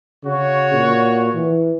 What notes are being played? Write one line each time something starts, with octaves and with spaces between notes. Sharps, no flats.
C#3 F#4 C#5
A#2
E3